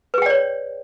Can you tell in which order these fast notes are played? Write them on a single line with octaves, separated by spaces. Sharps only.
B4 G#4 G5 D5 C#5